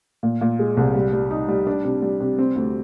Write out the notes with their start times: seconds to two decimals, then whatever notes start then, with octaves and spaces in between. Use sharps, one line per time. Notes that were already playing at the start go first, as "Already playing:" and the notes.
0.23 A#2
0.41 A#2
0.59 G#3
0.77 C2
0.94 G3
1.13 G3
1.31 D#4
1.49 G3
1.67 D4
1.84 C3
2.02 G3
2.21 C3
2.38 C4
2.56 D2